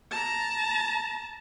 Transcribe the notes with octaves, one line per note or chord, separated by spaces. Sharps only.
A5 A#5